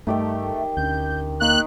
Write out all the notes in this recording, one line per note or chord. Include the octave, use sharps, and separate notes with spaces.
G2 D#3 A3 G4 G5
D2 C#4 D4 G6
D#3 A#3 F#6